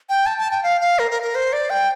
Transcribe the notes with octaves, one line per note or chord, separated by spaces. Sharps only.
G5
A5
A5
G5
F5
F5
A#4
A#4
A#4
C5
D5
G5